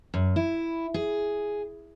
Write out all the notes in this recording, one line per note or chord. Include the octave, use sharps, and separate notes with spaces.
F#2
E4
G#4